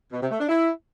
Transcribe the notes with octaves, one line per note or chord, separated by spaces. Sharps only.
B2
C3
A3
D4
E4